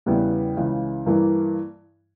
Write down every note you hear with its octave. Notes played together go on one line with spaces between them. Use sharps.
E2 C#3 G3 B3 E4
C#2 C#3 E3 G#3
G2 E3 A#3 E4